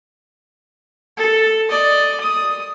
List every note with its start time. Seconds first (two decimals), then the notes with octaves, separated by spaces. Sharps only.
1.17 A4
1.69 D5 D#5
2.20 D#6